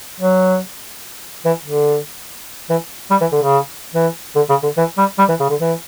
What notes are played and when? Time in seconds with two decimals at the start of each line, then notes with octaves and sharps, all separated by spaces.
0.20 F#3
1.45 E3
1.65 D3
2.69 E3
3.10 G3
3.21 E3
3.32 D3
3.42 C#3
3.94 E3
4.35 D3
4.49 C#3
4.63 D3
4.77 E3
4.98 G3
5.18 G3
5.29 E3
5.40 C#3
5.49 D3
5.60 E3